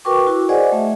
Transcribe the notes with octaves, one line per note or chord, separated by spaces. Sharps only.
F#4 A#4 B4 G5 C#6 D6
E4 F#4
G#4 C5 D5 D#5 F#5 G#5
A3 E5